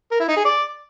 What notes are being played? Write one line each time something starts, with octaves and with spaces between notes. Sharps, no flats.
A#4
E4
D#4
G#4
D5